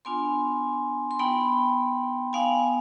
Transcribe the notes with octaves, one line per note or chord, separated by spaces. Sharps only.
B3 D4 F4 G#5 C6
C6
B3 D#4 G5 B5
B3 D#4 F5 G#5